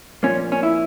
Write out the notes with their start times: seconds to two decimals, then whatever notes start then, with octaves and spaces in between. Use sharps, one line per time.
0.23 A#2 F3 A#3 C#4
0.52 C#4
0.63 E4